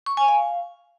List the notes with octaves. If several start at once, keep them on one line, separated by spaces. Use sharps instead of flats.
C#6
G#5
F5